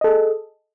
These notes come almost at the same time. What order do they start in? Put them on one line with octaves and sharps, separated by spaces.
D#5 A4 G#4